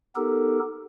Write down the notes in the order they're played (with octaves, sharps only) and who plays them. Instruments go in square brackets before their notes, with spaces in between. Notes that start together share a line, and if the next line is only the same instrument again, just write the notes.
[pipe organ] B3 D#4 G4 A4 A#4